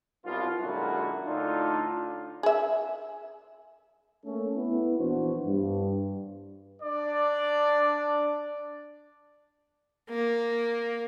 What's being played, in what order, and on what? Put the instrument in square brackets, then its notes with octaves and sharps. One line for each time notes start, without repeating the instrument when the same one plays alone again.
[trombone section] C2 F#2 B2 B3 F4
F#2 A#2 D3 G#3 E4 F#4
A2 D3 D4 D#4 F4
[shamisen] G#4 E5
[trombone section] A3 A#3 C#4 A4
B3 E4
A#1 E3 D4 F#4 C5
G2
[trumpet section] D4 D5
[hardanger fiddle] A#3